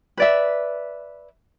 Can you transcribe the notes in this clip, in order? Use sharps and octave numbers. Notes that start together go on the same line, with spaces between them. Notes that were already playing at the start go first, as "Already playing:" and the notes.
B4 D5 E5